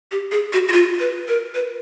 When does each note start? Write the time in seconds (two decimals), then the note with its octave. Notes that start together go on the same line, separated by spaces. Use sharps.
0.11 G4
0.31 G#4
0.53 F#4
0.68 F#4
0.72 F4
1.00 B4
1.28 A#4
1.55 B4